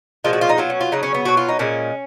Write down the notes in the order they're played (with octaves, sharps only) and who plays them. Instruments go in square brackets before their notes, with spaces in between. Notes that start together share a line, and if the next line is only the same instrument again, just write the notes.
[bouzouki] A#2 F3 G#3 F4
F#4
F4
D#4
B2 F#3 F4
C#4
F4
C#3 F#3 D#4
C#4
B3
B2 F#3 F#4
F4
D#4
A#2 G#3 C#4